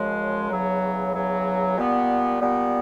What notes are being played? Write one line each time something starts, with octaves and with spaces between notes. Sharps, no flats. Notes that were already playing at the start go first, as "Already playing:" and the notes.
Already playing: F#2 C#3 F3 G#3
E2 C#3 F#3
E2 C#3 F#3
A#2 G3 B3
A#2 G3 B3